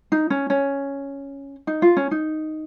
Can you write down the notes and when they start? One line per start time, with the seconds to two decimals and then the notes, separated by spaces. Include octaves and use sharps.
0.12 D#4
0.30 C#4
0.50 C#4
1.67 D#4
1.82 F4
1.97 C#4
2.11 D#4